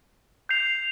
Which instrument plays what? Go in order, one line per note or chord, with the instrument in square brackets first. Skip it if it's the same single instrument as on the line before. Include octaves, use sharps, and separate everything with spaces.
[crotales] G6 C7 F7